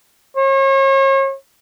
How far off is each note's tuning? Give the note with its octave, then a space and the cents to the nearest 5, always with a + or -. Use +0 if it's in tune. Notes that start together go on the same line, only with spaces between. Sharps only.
C#5 -40